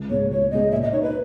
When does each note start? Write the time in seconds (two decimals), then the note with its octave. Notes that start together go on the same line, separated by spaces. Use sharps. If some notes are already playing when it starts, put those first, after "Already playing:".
Already playing: C#2
0.10 B2 G#3 C#5
0.31 C#2 C#5
0.51 B2 G#3 D#5
0.71 A#2 E5
0.82 D#5
0.92 A#3 D#4 C#5
1.02 B4